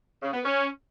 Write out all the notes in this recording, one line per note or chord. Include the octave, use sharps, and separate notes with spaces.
C#3
B3
C#4